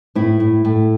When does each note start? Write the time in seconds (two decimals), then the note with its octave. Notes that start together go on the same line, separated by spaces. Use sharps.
0.15 A2 E4
0.40 A2
0.65 A2